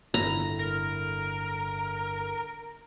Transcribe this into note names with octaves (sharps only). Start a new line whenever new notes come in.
G1 A2 A#5 B5
A#4